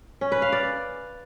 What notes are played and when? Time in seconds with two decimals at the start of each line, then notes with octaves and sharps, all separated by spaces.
0.21 C#4
0.32 B4
0.42 F5
0.52 D5